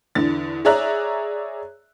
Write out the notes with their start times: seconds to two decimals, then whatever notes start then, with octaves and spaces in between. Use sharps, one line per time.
0.15 E2 D3 A6
0.65 G#4 C#5 D5 E5 A#5 F#6